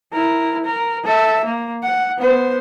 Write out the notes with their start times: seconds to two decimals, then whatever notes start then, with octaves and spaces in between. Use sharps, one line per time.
0.13 E4 A#4
0.65 A#4
1.04 A4 E5
1.45 A#3
1.83 F#5
2.18 B3 C5